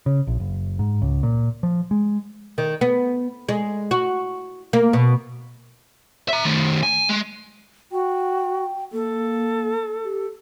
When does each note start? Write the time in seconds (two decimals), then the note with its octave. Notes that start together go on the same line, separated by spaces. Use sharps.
0.06 C#3
0.27 A#1
0.40 F#1
0.79 G#2
1.02 C#2
1.23 A#2
1.63 F3
1.91 G#3
2.58 D#3
2.81 B3
3.49 G#3
3.91 F#4
4.73 A#3
4.93 B2
6.28 E5 A#5
6.45 D#3 A3
6.83 G#5
7.09 G#3
7.92 F#4 G5
8.93 A#3 A4
10.05 G4